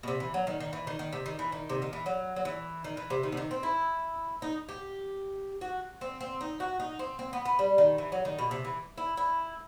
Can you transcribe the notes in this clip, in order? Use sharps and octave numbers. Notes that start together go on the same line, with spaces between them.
B2
C3
E3
F#3
D#3
D#3
E3
D#3
D#3
C3
D#3
E3
D#3
C3
D#3
E3
F#3
F#3
E3
D#3
E3
C3
D#3
C3
D#3
C4
E4
D#4
G4
F#4
C4
C4
D#4
F#4
D#4
C4
C4
B3
B3
G3
D#3
E3
F#3
D#3
B2
C3
E3
E4
E4